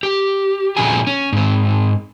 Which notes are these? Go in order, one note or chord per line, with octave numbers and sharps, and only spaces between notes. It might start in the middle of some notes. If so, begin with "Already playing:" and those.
G4
A#2 F3 C#4 F#4 G#4 G#5
C#4
G#2 C4